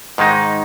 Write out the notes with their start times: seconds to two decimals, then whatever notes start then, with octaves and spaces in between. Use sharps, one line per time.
0.18 G#2 D#3 G#3 D#4